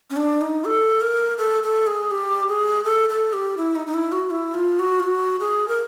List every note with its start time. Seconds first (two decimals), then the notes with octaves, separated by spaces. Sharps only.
0.10 C#4
0.16 D4
0.41 D#4
0.65 A4
1.01 A#4
1.38 A4
1.63 A4
1.87 G#4
2.11 G4
2.48 G#4
2.84 A4
3.09 A4
3.33 G4
3.58 E4
3.75 D#4
3.87 D#4
3.94 E4
4.12 F#4
4.31 E4
4.54 F4
4.79 F#4
5.00 F4
5.03 F#4
5.40 G#4
5.68 A#4